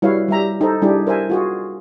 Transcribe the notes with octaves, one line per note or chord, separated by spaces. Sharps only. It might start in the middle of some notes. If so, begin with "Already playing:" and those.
G3 E4 F#4 B4 C#5 F5
G3 G4 E5 A#5
D#4 A4 C5
G3 D4 E4 G4 G#4
A#4 C5 E5 G#5
F4 F#4 G#4